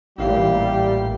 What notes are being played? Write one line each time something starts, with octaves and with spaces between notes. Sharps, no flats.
A1 A#2 G3 E4 G4 F5 C7